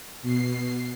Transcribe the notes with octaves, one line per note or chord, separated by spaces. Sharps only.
B2 C7